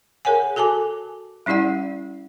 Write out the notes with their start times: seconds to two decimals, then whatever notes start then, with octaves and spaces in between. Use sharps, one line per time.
0.25 G#4 A#4 C#5 F#5 G#5
0.56 F#4 A4 G#5 A5 D6
1.46 G3 C#4 E4 G4 D5 F#5